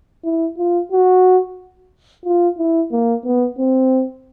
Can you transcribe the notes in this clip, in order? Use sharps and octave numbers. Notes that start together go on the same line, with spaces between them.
E4
F4
F#4
F4
E4
A#3
B3
C4